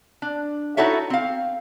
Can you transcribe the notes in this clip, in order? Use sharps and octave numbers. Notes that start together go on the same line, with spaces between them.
D4
D#4 E4 F#4 A4 C#5 E5
C4 F5